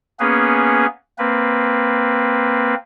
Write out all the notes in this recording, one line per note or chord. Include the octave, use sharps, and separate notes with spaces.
A#3 B3 C#4 G#4 B4
A#3 C4 B4